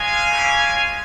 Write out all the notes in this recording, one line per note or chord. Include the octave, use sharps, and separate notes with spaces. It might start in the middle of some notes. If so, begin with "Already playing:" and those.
Already playing: G#3 C#4 F4 F5 G#5
G3 A#3 C#4 E4 G4
G#3 C#4 F4